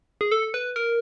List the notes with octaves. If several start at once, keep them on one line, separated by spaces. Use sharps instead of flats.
G#4
A4
B4
A#4